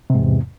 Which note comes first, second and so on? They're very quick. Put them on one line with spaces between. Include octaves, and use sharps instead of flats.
C3 G#2 E2